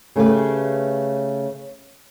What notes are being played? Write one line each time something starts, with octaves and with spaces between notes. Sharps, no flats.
C#3 A3 G4 B4